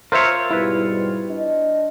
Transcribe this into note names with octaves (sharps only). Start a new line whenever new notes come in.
F4 A#4 C5 C#5 E5
G#2 B2 G3 E4 B4
D4 D#5